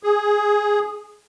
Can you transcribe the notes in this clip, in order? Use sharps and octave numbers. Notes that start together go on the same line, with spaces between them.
G#4